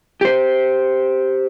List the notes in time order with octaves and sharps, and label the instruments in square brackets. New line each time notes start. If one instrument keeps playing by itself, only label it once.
[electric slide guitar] G4 C5